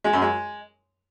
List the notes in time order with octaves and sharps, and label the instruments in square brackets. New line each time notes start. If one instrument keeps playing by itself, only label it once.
[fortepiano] G#3
F#2
G#3